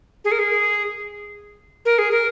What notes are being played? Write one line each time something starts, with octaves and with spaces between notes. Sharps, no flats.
G#4
A#4
G#4
A#4
G#4
A#4